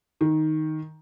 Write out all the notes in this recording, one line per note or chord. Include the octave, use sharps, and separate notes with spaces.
D#3